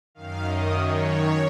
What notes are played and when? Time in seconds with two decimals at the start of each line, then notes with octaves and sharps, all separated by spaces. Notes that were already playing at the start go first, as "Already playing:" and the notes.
0.15 F#2 D#3 F5
0.44 D#5
0.73 C#5